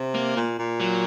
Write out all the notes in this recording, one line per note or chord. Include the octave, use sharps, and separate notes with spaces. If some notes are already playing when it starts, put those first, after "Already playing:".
Already playing: C3
A#3
A#2
A#2
F#3